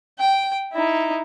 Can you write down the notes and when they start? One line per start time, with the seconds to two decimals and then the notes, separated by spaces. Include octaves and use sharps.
0.19 G5
0.73 D#4 E4